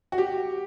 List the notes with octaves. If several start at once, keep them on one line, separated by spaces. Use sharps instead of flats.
F#4
G4